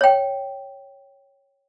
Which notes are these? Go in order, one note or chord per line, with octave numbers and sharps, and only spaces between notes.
C#5 G5